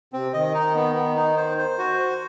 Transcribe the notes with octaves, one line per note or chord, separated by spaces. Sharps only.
C3 C4
D#3 D#5
D#4
B3
B3
D#4
C5
C5
F#4
C5